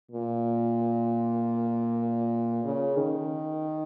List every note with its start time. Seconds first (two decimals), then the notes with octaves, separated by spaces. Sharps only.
0.11 A#2
2.65 C#3
2.97 D#3